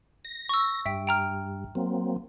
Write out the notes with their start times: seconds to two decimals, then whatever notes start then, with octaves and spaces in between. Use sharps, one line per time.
0.25 A#6
0.49 C#6 E6
0.86 G2 E5 G5
1.07 G5 A#5 F6
1.75 F#3 A#3 C4